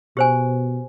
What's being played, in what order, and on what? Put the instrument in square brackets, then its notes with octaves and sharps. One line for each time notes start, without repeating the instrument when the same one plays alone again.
[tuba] B2 [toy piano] G4 C5 G#5